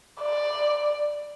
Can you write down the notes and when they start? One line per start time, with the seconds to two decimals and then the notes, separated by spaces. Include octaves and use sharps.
0.22 D5